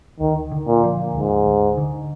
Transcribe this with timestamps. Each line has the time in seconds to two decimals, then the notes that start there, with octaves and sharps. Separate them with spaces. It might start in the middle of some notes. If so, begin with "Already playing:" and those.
0.20 D2 D#3
0.52 D3
0.67 A#2
0.84 F3
1.14 D2 G#2
1.46 D2
1.77 D3